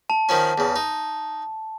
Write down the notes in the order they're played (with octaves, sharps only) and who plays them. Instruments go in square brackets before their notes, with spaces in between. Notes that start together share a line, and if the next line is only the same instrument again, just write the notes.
[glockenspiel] A5
[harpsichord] D#3 F3 C#4
E2 C#3
D#4